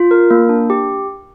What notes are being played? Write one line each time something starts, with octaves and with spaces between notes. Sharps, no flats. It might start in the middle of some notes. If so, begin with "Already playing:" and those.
Already playing: F4
A#4
A#3
D4
G4